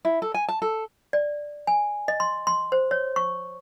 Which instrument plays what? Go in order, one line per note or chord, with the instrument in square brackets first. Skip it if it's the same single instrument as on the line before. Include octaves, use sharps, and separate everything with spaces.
[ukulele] E4
A4
G#5
A5
A4
[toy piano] D5
G#5
D#5
C6
C6
C5
C#5
C#6